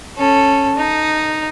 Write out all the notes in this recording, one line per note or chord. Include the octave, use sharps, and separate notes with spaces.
C#4 A4
D#4